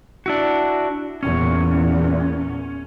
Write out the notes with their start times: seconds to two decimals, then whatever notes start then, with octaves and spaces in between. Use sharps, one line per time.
0.26 D4 E4 F#4
1.23 E2 A#2 C#4